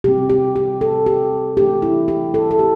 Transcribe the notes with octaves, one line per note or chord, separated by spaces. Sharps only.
C3 G3 C4 G4
G4
G4
A4
G4
E3 A3 D4 G4
E4
G4
A4
A4
G4